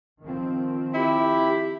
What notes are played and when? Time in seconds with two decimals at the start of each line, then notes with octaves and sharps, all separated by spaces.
0.22 D#3 F3 C4
0.94 E4 G4 B5